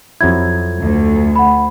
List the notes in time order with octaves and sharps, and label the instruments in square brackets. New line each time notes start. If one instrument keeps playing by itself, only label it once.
[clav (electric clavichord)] F2 F#3 E4 [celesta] G#6
[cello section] D2
[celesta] F#5 B5